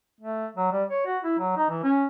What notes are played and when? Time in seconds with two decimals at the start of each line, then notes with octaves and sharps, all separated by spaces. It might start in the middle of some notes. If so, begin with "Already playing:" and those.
0.21 A3
0.57 F#3
0.72 G3
0.90 C#5
1.06 F#4
1.24 E4
1.39 F#3
1.57 D#4
1.70 E3
1.83 C#4